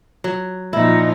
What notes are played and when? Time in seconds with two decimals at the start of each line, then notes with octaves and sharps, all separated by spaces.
0.24 F#3
0.73 A#2 F3 D#4 E4